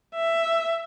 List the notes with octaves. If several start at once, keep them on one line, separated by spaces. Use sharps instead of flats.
E5